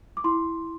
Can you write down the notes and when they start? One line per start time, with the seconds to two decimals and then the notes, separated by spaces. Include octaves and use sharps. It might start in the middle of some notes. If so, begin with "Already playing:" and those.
0.17 D6
0.24 E4 C6